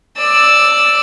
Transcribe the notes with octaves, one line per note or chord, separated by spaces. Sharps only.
D5 E6